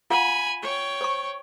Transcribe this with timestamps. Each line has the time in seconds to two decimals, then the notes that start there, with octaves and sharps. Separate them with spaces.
0.10 F4 F5 F#5 G#5 B5
0.62 C#5 G5
1.01 C5 C#6